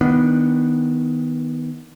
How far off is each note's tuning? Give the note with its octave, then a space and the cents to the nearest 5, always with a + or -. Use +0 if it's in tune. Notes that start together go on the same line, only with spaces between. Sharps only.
D#3 +15 B3 +0 D4 +0